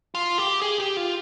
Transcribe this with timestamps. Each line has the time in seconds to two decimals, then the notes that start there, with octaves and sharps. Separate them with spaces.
0.15 F4
0.38 G4
0.62 G#4
0.80 G4
0.97 F4